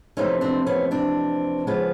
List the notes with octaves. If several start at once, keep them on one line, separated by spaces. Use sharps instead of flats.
F2 C3 E3 A3 C#4 D#4
C4 D4
B3 C#4
C4 D4
D#2 C#3 F3 G#3 B3